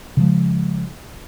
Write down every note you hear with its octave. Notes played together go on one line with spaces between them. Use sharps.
C#3 F3 G#3